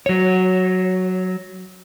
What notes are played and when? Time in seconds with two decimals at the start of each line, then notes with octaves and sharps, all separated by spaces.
0.06 F#3 C#5